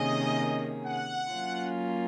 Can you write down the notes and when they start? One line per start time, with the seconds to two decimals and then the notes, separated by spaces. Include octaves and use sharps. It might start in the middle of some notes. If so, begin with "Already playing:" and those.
Already playing: C3 D#3 A#3 C#4 G#4 D#5
0.86 F#5
1.32 F#3 A#3 C#4 F4